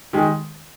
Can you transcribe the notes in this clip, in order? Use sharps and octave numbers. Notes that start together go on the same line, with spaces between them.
D#3 G#3 G4